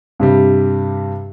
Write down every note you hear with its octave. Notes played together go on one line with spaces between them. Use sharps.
G2 C3 G3